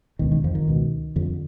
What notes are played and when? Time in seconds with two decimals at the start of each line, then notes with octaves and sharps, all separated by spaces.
0.19 C#2 B2 D#3
0.32 D#3
0.44 F2 F3
0.55 D#3
0.67 C#2 B2
1.16 F2 D3